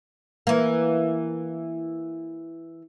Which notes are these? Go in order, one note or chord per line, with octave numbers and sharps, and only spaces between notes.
E3 A#3